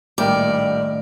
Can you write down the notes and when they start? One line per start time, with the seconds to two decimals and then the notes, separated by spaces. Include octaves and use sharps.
0.18 A#1 A2 D#3 G3 A#4 D5 G5 D6